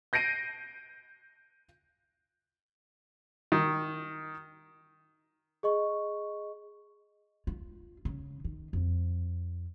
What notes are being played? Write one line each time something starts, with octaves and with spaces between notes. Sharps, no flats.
G6 A#6 C7 D7 D#7
D#3
G#4 D#5 C#6
F4
C#3
D#3
F2